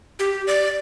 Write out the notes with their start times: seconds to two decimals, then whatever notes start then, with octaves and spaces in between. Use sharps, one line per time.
0.19 G4
0.47 D5